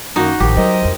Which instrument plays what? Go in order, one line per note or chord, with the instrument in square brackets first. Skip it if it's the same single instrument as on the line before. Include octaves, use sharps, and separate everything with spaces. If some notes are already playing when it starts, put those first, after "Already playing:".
[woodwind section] F#2 D#3 A#3 [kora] D#4 F#4
[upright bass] A1 [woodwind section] G#2 D#3 F3 [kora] G4
[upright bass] F#3 [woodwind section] A#4 C5 D#5
[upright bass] C2 F2